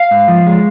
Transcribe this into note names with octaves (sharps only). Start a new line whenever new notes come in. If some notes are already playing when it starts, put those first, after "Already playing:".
Already playing: F5
G#2
F3
G#3